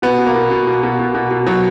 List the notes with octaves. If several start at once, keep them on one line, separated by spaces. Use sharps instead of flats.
B2 B3
B2
A#3
B2
B2
B2
B2
B2
B2
B2
B2 F#3